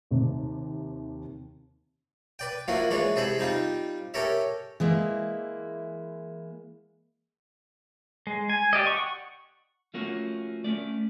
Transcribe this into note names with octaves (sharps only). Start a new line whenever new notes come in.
D#2 C3
B4 D5 G5
F3 A#3 D4 E4 F#4
E3 G#3 D4 B4 C#5
C3 G#4 A4 C5 G#5 B5
G3 C4 D#4 F4
C#4 G4 A4 A#4 C#5 E5
E3 G#3 A#3 E4
G#3
G#5
G4 D5 D#5
F#5 C#6
F3 A3 A#3 C#4 F#4
A3 C#4 A#4 D5